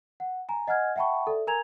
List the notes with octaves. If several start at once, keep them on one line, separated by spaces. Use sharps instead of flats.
F#5
G#5 A#5
D#5 F#5 G#5 F6 G#6
E5 F#5 G5 A5 B5 C#6
A4 D5 E5
A#4 G#5 A#5 G#6 F7